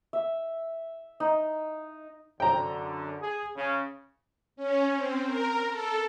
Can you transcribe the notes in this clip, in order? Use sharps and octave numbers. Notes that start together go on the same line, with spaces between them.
E5
D#4
F#2 D3 G5 A#5
G#4
C#3
C#4
C4
A#4
A4